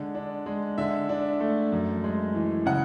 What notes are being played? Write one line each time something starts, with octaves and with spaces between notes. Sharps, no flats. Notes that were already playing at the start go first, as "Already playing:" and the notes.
Already playing: D3 G#3
D4
G#3
D3 E5
D4
A3
F#2
G#3
E3
C#3 F#5